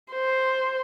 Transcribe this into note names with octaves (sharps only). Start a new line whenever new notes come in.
C5